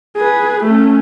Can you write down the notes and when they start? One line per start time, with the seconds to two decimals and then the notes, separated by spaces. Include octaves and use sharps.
0.16 G#4 B4
0.64 A3 C#4